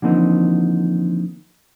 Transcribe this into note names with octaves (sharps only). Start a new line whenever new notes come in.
D3 E3 F3 A#3 C4 D#4